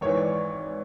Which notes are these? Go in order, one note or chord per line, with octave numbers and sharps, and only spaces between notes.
G#1 G#2 E3 C#5
D5